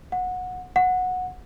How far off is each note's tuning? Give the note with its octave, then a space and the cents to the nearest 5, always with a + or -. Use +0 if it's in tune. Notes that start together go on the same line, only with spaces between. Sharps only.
F#5 -20
F#5 -15